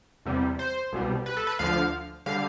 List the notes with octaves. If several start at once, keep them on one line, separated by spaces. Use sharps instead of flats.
E2 C3 G3
C5
C2 B2 G3
B4
A4
B4
D2 D3 F3 F5
D3 G3 F5